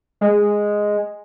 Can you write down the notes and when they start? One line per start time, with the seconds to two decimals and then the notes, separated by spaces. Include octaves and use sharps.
0.21 G#3